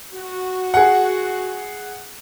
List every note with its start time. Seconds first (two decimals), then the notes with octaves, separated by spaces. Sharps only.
0.14 F#4
0.74 G#4 F#5